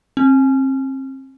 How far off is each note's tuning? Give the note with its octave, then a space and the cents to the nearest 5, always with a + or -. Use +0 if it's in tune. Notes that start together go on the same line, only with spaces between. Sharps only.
C4 +35